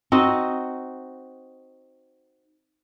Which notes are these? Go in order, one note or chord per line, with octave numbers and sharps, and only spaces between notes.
C4 D#4 F#4 D#5